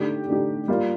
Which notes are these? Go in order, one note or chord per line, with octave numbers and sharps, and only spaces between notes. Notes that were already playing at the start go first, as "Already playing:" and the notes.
Already playing: D3 A3 D#4 G4
D3 A3 D#4 G4
G3 A#3 F4